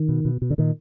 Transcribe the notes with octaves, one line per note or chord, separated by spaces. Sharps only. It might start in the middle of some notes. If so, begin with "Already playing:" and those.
Already playing: D#3
B2
B2
B2
D3
A#2 D#3